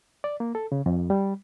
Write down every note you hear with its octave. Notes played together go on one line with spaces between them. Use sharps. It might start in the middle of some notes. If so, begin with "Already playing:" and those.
D5
A#3
A4
C#3
F2
G3